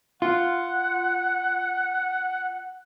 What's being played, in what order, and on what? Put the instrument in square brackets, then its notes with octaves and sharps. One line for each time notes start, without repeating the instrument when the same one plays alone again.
[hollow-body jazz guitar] F4 [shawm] F#5